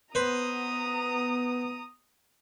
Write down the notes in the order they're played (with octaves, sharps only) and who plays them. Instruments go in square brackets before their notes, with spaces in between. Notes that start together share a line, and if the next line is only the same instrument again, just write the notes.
[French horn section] B3 [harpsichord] B4 C5 [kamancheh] A#5 D#6